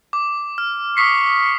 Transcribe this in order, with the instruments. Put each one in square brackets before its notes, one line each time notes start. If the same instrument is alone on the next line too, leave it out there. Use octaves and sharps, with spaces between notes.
[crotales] D6
F6
[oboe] C#6 [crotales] D#6 B6 C7